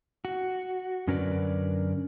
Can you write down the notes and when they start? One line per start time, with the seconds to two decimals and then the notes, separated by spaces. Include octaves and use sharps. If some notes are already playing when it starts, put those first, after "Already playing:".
0.25 F#4
1.07 F#2 D3 C#4 A#4 B4 D5